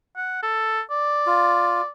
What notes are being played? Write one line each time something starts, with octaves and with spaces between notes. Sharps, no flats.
F#5
A4
D5
F4